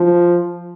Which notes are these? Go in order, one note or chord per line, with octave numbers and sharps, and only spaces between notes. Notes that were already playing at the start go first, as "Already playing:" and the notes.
Already playing: F3